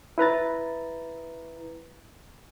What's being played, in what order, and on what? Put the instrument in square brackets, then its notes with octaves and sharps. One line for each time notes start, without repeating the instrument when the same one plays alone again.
[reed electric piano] E4 B4 A#5 A6